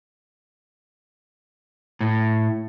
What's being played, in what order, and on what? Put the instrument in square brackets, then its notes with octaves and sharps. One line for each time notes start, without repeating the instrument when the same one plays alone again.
[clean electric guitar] A2